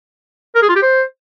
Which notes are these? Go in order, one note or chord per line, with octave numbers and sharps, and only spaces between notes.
A#4
G#4
F4
G4
C5